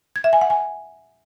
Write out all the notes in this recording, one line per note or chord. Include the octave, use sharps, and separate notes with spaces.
G#6
E5
G#5
F#5
G#5